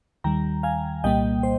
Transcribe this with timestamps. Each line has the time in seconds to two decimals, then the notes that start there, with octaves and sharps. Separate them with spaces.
0.24 D#2 D#3 G3 G5 A#5
0.63 F5 G#5
1.04 C2 A#2 G3 A#3 D#5 G5
1.43 C5